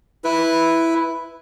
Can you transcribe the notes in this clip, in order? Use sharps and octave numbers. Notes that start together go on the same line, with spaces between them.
E4 B4